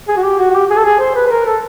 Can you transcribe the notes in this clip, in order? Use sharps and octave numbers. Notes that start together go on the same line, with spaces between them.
G#4
F#4
G4
F#4
F#4
G4
G#4
A4
G#4
C5
B4
B4
A#4
A4